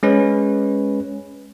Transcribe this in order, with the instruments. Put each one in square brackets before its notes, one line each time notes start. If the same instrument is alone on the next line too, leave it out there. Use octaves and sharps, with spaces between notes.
[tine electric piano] G#3 C#4 B4